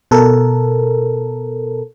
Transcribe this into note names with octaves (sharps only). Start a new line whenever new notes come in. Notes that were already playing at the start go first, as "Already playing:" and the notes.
B2 A4 A#4